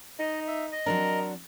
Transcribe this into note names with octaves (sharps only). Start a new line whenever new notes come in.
D#4 D#5
E5
D#5
F#3 C4 D4 A#4